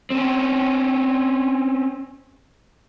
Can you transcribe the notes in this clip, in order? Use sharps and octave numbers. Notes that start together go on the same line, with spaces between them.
C4 C#4